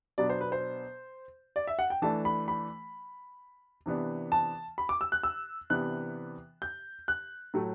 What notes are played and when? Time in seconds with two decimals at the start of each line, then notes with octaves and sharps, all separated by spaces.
0.18 B2 F#3 B3 D4 D5
0.30 C5
0.41 B4
0.52 C5
1.56 D5
1.67 E5
1.79 F#5
1.90 G5
2.02 E3 A3 D4 A5
2.25 B5
2.48 B5
3.86 C3 E3 B3 D4
4.32 A5
4.78 B5
4.89 D6
5.01 E6
5.12 F#6
5.23 E6
5.70 C3 E3 B3 D4 F#6
6.62 G6
7.08 F#6
7.54 A2 F#3 A3